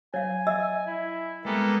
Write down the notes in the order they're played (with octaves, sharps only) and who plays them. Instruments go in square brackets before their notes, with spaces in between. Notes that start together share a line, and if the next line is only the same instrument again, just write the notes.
[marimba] F#3 [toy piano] C#5 F5 [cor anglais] G#5
[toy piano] D#5 E5 E6
[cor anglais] E4
[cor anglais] G3 [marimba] G#3 [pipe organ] A#3 B3 A4